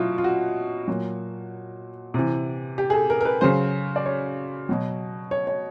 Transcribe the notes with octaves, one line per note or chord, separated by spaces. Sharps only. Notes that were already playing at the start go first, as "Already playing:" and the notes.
Already playing: B2 F#3 E4 F4
F4
F#4
A#2 F#3
C3 E3
G4
G#4
A4
A#4
A#4
B4
C#3 F#3 C5
D5
C#5
B2 F#3
C#5
C#5